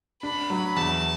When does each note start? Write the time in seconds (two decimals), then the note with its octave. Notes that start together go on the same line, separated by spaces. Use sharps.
0.23 D4 B5
0.50 F#3
0.76 E2 A5